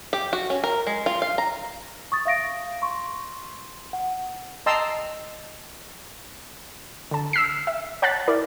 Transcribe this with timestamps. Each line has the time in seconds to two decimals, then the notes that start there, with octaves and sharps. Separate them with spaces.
0.13 G4
0.33 F#4
0.50 C#4
0.64 A#4
0.87 G#3
1.06 F4
1.22 F5
1.38 A#5
2.12 C#6 D#6 A6
2.25 E5 F5 A#6 D7
2.82 C6 C#6
3.93 F#5
4.66 D#5 G5 A5 A#5 C6 E6
7.11 D3 A5
7.33 E6 F6 B6 C7
7.67 E5
8.02 C#5 F#5 A5 F#6 A6 B6
8.27 E4 A#4 D5